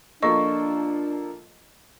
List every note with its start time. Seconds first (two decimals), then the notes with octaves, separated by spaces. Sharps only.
0.22 F3 A#3 D4 A4 D#5 C#6